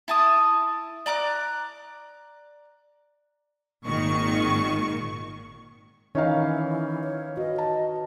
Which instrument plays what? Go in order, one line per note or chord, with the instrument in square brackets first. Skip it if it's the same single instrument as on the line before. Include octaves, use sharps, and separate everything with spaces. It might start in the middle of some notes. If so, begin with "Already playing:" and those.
[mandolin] E4 A5 D#6
D5 A#5 D6 F#6
[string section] G#1 A#2 D#3 C#6
[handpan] D#3 [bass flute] E3 [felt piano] C#4 D#4 F5
[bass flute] C#5
[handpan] F#4 B4 [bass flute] D#5
[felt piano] A5